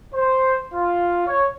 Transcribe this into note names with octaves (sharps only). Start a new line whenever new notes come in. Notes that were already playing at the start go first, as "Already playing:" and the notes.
C5
F4
C#5